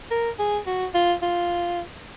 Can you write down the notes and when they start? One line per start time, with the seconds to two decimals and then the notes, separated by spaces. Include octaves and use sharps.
0.11 A#4
0.39 G#4
0.67 F#4
0.94 F4
1.22 F4